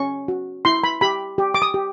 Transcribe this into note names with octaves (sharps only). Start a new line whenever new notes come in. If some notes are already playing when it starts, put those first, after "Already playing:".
Already playing: C#4 C#6
F#4
E4 C6
B5
G4 B5
G4
D6
D#6
G4